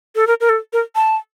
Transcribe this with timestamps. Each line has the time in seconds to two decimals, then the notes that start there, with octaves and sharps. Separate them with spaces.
0.16 A4
0.27 A#4
0.41 A#4
0.49 A4
0.73 A#4
0.95 A5